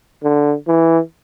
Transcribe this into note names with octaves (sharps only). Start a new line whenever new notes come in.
D3
E3